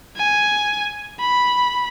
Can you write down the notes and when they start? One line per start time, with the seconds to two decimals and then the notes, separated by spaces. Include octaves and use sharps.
0.17 G#5
1.20 B5